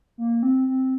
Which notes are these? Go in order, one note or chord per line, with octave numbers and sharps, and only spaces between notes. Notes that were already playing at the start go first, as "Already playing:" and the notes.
A#3
C4
C4